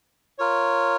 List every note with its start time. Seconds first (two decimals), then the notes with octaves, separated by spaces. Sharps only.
0.39 F4 A#4 C#5